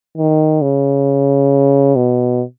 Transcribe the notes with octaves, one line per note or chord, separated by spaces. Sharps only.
D#3
C#3
B2